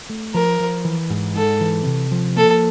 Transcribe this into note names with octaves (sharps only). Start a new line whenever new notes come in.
A3
F3 A#4
F3
E3
G#2
G#2 A4
E3
C3
F3
A#3 A4